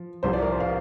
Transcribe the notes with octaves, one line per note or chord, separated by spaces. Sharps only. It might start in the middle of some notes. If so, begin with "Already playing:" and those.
Already playing: F3
C2 C3 F3 C5
D5
A#4
C5
F5